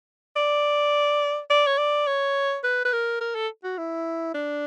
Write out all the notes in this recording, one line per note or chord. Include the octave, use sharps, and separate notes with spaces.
D5
D5
C#5
D5
C#5
B4
B4
A#4
A#4
A4
F#4
E4
D4